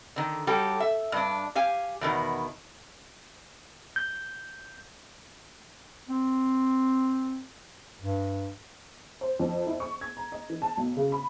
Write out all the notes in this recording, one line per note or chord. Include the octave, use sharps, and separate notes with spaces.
D3 D#3
F#3 G3 G4 A4
E5
G2 D4
G4 F5 G#5
E2 B2 D#3
G6
C4
G2
C5
F2
E4
C#6
G#6
A#5
D#5
E3
A5
B1
C#3
B5